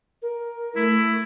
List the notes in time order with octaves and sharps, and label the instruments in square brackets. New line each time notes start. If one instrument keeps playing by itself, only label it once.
[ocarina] A#4
[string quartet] A3 [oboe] E4